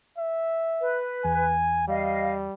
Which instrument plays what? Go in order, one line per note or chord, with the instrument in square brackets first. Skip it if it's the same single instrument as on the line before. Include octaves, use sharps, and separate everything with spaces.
[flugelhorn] E5
[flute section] B4
[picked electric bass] E2 [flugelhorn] G#5
[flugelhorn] G3 [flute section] D#5 F5